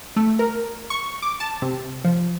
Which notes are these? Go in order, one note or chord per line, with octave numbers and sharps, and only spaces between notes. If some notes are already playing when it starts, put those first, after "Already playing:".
A3
A#4
C#6
D6
A5
C3
F3